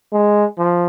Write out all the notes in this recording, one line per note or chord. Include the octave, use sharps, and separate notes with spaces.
G#3
F3